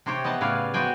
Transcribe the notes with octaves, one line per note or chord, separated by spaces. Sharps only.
C3 G4 C5 C#5 G5
B3 D#5 E5 A5
A2 C#3 B4 C#5 D5 F5
B3 F#4 C5 G5 G#5